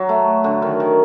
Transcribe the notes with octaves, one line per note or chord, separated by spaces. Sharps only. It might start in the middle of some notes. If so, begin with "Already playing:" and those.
Already playing: F#3
A3
D3
D#3
D#3